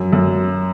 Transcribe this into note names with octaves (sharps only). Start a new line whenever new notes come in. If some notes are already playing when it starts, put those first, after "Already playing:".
Already playing: F#2
F#2